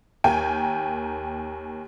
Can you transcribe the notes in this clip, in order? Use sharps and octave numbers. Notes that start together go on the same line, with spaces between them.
D#2 A#4 G5 G#5